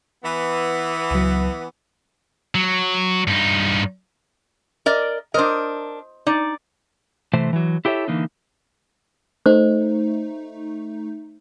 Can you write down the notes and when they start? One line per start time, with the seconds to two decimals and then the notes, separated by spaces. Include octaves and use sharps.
0.24 E3 B3
1.11 C#2 F#3
2.55 F#3
3.28 G2 D#4
4.86 A#4 D5 D#5
5.34 D4 A#4 C5 D#5
6.27 D#4 D5
7.33 C3 E3 A3 C5
7.53 E3 F#3
7.85 E4 G4 A4 C#5 E5
8.08 D3 E3 A#3 D#4
9.46 A3 D#4 C5